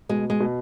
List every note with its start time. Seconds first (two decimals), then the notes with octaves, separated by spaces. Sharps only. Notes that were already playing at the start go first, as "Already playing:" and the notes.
0.09 B2 G#3
0.30 G#3
0.40 B2